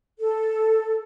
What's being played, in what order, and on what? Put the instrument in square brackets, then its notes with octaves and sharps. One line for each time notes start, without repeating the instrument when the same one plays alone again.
[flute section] A4